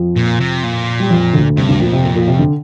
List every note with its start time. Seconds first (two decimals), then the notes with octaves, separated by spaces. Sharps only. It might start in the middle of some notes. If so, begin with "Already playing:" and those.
Already playing: F2 F3
0.16 A#2
0.40 C3
0.63 A#2
1.00 G3
1.10 F2 F3
1.33 D2 D3
1.57 G2 C3
1.69 D2 D3
1.80 F2 A#2
1.93 C3
2.04 A#2
2.15 A#2
2.28 C3
2.39 D3